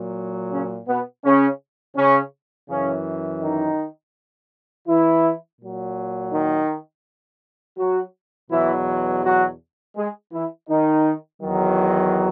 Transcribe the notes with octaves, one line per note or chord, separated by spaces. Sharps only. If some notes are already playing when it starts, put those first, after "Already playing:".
Already playing: A#2 F#3
C#3 C#4
B2 B3
C#3 C#4
C#3 C#4
F#2 C#3 E3 C#4
D#3 D#4
E3 E4
A#2 F#3
D#3 D#4
F#3 F#4
E2 B2 E3 F#3 E4
F#3 F#4
G#3 G#4
E3 E4
D#3 D#4
E2 D#3 F#3